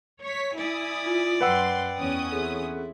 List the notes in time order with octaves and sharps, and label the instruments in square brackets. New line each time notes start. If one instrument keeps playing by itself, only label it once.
[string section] C#5 B6
[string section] E4 G#5 D#6 [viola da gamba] D5
[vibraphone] F4
[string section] F#2 C6 [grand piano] B4 F#5 E6 [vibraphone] G5
[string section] E2 C#4 D#6
[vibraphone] C4 G#4 A4 [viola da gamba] E4